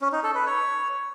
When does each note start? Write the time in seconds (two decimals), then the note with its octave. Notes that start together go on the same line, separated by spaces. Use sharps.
0.01 C#4
0.12 D#4
0.24 A4
0.35 B4
0.46 C#5